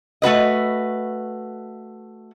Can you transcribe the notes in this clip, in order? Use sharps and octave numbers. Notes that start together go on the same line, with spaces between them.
A3 F#4 B4 D#5